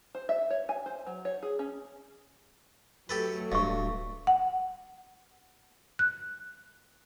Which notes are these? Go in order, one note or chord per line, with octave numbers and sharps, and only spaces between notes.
C5
E5
C#5
G#5
C5
F#3
C#5
G#4
C#4
F#3 A3 G4 A4 B4
D1 G2 D#5 C#6
F#5
F#6